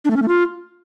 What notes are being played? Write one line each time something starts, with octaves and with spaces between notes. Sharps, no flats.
D4
A3
C#4
A3
F4